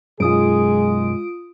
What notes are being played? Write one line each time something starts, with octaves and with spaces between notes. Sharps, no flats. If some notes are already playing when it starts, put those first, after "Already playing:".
B1 F#2 G#3 F4 G#4 D#6 D7